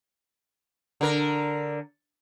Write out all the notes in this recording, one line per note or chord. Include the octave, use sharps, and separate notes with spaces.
D3 A#4